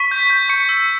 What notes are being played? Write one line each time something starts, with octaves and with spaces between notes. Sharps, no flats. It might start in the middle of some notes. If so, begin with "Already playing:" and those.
Already playing: C#6 B6
G6
G6
C#6 C#7
E6